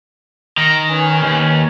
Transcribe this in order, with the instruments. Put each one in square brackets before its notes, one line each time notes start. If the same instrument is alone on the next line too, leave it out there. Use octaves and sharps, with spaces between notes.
[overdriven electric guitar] D#3 [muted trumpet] A#5
[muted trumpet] C#4 [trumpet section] B4 G#5
[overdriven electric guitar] D#2